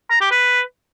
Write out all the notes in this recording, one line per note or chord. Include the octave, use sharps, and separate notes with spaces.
A#5
G4
B4